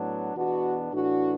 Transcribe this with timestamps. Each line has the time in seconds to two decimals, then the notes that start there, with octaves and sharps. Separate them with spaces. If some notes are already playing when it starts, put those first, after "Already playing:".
Already playing: A2 F#3 B3 D4
0.36 E2 B2 B3 D4 F#4
0.93 A2 E3 D4 F#4